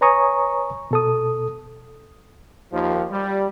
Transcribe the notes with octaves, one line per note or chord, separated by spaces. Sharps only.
B4 C#5 G#5 A#5 C#6 D#6
B2 A4 D#6
D#2 F3
G3